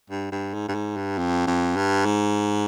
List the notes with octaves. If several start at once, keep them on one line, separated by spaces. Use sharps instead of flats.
G2
G2
G#2
G2
G#2
G2
F2
F2
G2
G#2